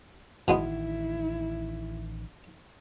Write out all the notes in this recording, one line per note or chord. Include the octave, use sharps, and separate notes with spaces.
A1 B2 D#3 G#3 B3 E4